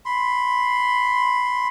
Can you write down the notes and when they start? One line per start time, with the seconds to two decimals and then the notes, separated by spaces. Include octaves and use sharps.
0.05 B5 C6